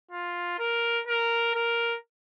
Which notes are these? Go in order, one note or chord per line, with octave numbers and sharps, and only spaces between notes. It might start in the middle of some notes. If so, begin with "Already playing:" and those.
F4
A#4
A#4
A#4